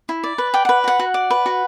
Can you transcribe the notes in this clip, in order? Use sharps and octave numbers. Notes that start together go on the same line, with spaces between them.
E4
D5
B4
D5 G5
B4 F#5
F#4 F#5
F#4
D5
B4
F#4